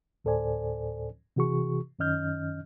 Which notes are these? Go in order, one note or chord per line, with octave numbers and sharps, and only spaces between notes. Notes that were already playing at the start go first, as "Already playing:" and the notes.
D2 A2 A4 C5 D5 G#5
C3 E3 F#4 G#4 C#6
F#2 D#3 C#4 D#5 F6 G6